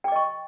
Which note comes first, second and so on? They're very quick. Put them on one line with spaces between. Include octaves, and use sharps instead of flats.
G5 D6 D#5 C#6